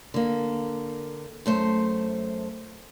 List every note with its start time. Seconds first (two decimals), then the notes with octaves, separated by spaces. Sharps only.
0.14 D3 A#3
1.46 F#2 A3 C5